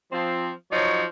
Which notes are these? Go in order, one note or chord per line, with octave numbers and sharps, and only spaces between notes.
F3 C4
F3 F#3 D#4 C#5